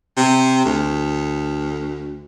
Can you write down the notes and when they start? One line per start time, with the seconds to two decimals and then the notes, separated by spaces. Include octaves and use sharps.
0.17 C3
0.65 D2